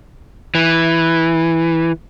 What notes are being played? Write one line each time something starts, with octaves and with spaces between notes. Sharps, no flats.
E3